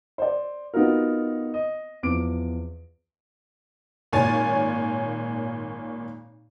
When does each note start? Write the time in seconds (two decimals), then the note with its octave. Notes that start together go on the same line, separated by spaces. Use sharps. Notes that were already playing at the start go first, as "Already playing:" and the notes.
0.18 C5 D5
0.74 B3 D#4 F4 F#4 A#4
1.54 D#5
2.03 E2 F3 D6 D7
4.13 G#1 A#2 C#5 G#5 A6